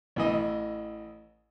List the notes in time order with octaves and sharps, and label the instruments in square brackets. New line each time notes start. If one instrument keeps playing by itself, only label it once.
[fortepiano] A1 E3 D#5